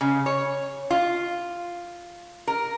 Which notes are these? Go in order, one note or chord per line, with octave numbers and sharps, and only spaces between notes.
C#3
C#5
F4
A#4